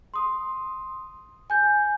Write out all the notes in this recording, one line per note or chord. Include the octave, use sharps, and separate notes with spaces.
C6 D#6
G#5 G6